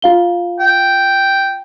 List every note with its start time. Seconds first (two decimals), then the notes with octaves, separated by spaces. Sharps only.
0.02 F4 F5 G7
0.60 G5